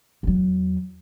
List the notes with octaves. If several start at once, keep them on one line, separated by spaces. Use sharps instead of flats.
E2 F#3